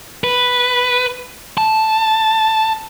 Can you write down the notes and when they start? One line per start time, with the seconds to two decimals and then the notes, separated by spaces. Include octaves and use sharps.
0.24 B4
1.58 A5